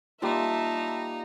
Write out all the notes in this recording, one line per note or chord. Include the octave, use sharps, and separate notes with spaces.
G3 A#3 D#4 F4 E5 A5 A#5